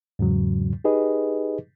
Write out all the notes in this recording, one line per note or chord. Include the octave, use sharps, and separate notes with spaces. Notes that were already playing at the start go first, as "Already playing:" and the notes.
E2 G#2 C#3 F#3
D#4 G4 G#4 B4 D#5